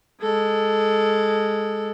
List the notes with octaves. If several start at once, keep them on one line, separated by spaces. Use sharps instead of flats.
G#3 A4